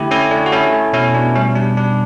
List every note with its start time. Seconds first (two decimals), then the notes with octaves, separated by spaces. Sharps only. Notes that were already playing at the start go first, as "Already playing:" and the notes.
Already playing: D3 A3 E4 G4
0.11 A3 C#4 E4
0.31 A3 D4
0.46 F#4
0.52 A3 C#4 E4
0.73 A3
0.93 B2 C#4 E4
1.15 B2 D4
1.35 G3 C#4
1.56 G3 D4
1.77 G3 D4